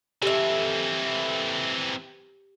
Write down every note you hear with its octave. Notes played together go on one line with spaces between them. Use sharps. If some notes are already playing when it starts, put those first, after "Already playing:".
E3 C4 G4 A4 E5